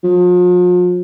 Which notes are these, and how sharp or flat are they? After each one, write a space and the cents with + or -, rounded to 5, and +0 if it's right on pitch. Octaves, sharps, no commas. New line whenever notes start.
F3 +40